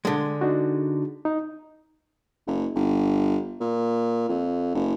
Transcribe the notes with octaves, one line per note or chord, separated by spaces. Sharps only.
D3 G#3
D4 D#4 F#4
D#4
F#1
G1
A#2
F2
F#1